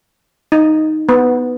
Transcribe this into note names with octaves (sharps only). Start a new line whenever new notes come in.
D#4
B3